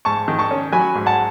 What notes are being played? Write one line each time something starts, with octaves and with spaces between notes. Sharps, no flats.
G#2 A5 C#6
D#3
A5 C#6
C#4
F#3 G#5 B5
G#2
F#5 A5